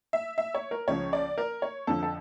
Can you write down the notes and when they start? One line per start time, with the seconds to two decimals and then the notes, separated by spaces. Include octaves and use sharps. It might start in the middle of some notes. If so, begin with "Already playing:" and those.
0.13 E5
0.38 E5
0.55 C#5
0.71 A#4
0.88 C#2 C#3 F3 C#5
1.13 D5
1.38 A#4
1.62 C#5
1.87 F2 D3 F3 A4
2.03 A4